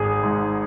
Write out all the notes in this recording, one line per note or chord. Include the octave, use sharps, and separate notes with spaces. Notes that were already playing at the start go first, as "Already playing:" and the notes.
Already playing: G#1 G#4
G#2